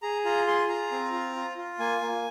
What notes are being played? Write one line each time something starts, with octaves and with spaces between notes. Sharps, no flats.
G#4 A#5
F4 A#5
G#4 C6
F4 A#5
C4
F4
F4
F4
A#3 G#5
A#3